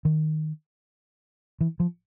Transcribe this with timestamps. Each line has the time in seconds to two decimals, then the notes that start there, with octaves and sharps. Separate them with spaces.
0.05 D#3
1.61 E3
1.80 F3